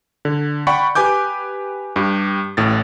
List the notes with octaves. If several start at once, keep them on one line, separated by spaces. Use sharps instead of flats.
D3
D5 F#5 G5 B5 C#6
G4 B4 G#5 D6 G6
G2 G4
A1 A2 A6